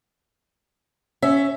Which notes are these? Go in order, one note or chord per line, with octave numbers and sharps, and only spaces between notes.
C#4 E5